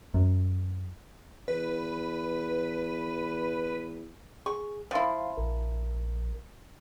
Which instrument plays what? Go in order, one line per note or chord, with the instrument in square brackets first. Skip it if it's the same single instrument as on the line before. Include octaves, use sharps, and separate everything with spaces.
[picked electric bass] F#2
[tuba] E2 [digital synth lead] B4
[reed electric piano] G#4 [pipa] C#6
[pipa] F3 E4 [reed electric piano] C5 F5 C6
[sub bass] A#1 [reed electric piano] A#4